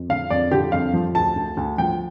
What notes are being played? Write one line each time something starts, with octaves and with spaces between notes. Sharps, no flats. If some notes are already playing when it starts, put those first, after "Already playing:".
Already playing: F2
D3 F5
F2 D5
D3 G4
F2 F5
F3
D2 A5
D2
D2
F3 G5